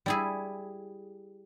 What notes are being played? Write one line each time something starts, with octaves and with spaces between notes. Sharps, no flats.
G3 E4 G#4